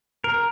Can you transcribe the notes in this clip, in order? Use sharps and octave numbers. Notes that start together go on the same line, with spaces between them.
A#4